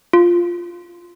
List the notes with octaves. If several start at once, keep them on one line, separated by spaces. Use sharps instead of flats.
F4